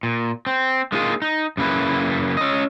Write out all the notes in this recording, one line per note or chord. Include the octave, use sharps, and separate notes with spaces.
A#2
C4
G#3 A#3 D#4 F4 G#4
D#4
F#2 C#3 A#3 E4 B4
C#4 D#5